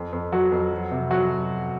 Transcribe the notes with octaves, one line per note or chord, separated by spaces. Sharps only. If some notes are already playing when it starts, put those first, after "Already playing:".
Already playing: F2
F2
F#3 F#4
F2
F#3
C3
F#3 F#4